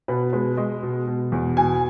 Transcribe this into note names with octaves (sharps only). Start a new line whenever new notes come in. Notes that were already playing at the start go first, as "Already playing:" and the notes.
B2 B4
G#3 B4
G#3 D#5
B2
B2
E2
B2 G#5